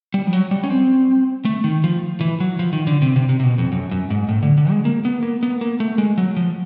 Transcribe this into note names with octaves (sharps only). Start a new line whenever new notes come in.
G3
F3
F#3
G3
C#4
C4
A3
D#3
F3
E3
F#3
F3
D#3
D3
C3
C3
C3
C3
B2
F2
F#2
F#2
G#2
A2
D3
D3
G#3
A#3
B3
A#3
B3
A#3
A3
G#3
F#3
F3